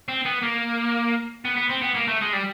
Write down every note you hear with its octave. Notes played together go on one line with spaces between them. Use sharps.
C4
B3
A#3
B3
B3
C4
B3
A#3
A3
G#3
G3